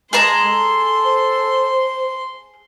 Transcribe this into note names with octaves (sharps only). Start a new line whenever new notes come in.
G#3 G#4 A5 A#5 C6
A4
C5